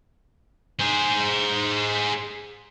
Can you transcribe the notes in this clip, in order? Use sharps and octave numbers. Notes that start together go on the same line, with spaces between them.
G#4 C5